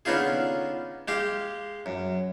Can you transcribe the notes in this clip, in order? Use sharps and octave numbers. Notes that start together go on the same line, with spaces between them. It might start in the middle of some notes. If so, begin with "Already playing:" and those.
D3 B3 C#4 D#4 F4 G#4
G#3 G4 F5
F#2